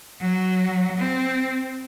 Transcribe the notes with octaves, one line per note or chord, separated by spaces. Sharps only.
F#3
C4